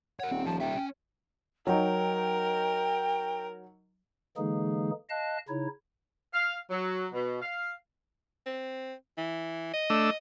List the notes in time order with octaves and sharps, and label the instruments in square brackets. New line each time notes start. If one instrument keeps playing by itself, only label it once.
[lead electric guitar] A#4 C#5 [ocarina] F#5
[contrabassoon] D#1 [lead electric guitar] C4
[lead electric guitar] F3 [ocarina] A5
[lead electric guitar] G3 E5 [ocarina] G5
[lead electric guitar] C#4
[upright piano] F#3 D#4 [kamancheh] A#4 [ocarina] G5
[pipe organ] D3 E3 G#3 A#3 D#4 G#4
D#5 F5 A5 F#6
C#3 D#4 E4 C#5
[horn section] F5
F#3
B2
F5
[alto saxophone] C4
E3
D#5
[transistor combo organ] A3 D4 E6